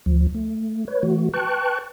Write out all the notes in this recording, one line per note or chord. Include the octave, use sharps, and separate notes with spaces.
D2 F3
A3
B4 C#5
E3 A3 F#4
B4 G5 A5 C#6 F#6